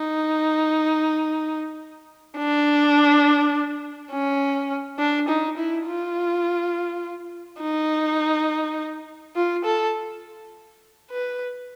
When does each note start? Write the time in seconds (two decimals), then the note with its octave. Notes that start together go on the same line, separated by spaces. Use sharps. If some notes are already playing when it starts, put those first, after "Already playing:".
Already playing: D#4
2.37 D4
4.12 C#4
4.99 D4
5.28 D#4
5.57 E4
5.86 F4
7.61 D#4
9.36 F4
9.65 A4
11.11 B4